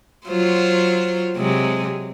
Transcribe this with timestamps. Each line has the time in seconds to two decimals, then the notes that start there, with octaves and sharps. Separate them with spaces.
0.27 F#3 F4 C5
1.37 C3 F#3 G#3